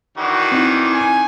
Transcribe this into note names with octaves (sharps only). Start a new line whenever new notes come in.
D#3 E3 D4 F#4
C4 D#4 E4
G#5